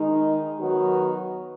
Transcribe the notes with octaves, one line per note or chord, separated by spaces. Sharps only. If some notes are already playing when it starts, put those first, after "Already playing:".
Already playing: D#3 G#3 D#4
D#3 F#3 B3 D#4 F#4